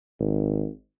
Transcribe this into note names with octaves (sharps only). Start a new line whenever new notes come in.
G#1